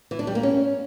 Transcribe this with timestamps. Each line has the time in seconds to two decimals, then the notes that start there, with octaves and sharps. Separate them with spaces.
0.11 E3
0.19 D4
0.27 G3
0.35 A#3
0.43 C#4